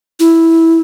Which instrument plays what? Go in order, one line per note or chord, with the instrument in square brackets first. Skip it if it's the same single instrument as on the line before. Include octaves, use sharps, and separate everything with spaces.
[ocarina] E4